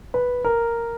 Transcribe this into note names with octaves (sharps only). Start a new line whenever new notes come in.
B4
A#4